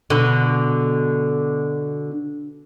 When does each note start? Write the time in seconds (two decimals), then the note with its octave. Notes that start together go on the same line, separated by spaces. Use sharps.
0.10 B2 D3